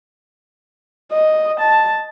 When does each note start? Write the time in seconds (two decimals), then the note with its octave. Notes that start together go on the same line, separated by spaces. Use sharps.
1.12 D#5
1.60 A5